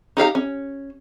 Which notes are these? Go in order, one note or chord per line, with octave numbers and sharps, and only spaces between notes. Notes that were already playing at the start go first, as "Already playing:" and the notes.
D#4 G4 F5 A#5
C#4